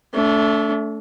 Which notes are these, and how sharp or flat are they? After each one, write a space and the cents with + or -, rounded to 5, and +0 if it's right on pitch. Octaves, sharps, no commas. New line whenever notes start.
A3 +0 D4 -40